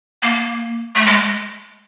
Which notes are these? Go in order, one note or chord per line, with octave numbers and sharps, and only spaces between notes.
A#3
A3
G#3